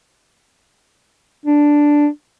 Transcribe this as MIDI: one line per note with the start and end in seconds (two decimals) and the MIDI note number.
1.46 2.07 62